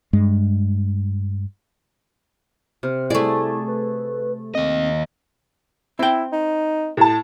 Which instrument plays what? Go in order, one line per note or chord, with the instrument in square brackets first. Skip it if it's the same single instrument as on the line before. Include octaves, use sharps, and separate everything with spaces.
[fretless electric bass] G2 G#3
[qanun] C3 [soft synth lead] F6
[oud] A3 D5 [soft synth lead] E4 [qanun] G#4
[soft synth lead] B4
[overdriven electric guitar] D#2 D#5 [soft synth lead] C4
[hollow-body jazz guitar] C4 G5 [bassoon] E4
[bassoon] D#4
[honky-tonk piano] A2 A5